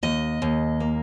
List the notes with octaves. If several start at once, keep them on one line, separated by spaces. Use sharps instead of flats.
D#2 D#5
D#2
A#3